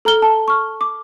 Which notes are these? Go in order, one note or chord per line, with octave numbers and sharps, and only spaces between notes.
A4 A#5 F6 G7
A5
C#6 F6
D6